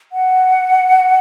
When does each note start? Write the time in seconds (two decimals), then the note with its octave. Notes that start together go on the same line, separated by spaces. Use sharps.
0.12 F#5